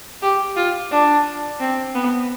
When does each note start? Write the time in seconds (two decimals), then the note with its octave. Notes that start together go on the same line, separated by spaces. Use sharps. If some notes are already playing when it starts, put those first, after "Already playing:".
0.22 G4
0.56 F4
0.91 D4
1.60 C4
1.95 B3